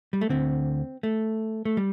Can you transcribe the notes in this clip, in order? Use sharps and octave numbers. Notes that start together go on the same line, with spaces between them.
G3
A3
D2 D3 C4
A3
A3
G3